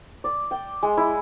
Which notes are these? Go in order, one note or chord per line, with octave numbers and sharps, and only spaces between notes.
D5
G5
G#3
E4